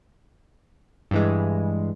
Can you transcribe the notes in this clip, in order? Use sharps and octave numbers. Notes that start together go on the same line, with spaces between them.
G2 E3 G#3